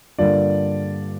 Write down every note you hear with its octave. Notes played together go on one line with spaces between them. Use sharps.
G2 D3 G3 A#3 F4 D5